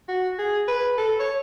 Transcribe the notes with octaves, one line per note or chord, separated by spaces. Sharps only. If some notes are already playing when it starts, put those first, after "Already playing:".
F#4
G#4
B4
A4
C#5